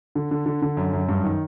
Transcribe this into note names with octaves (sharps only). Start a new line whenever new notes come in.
D3
D3
D3
D3
F#2
F#2
G2
D#3